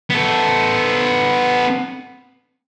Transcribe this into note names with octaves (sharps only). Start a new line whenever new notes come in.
B3 A4